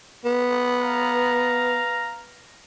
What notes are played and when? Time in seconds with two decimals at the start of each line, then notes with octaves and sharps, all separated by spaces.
0.25 B3
0.80 B4 F5 A#5